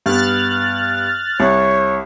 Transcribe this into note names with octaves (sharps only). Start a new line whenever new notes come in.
G2 B3 F6 F#6 A6
C2 C#5